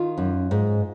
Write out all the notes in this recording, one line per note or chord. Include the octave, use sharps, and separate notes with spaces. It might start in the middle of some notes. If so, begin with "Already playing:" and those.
Already playing: D#3 F4
F#2
G#2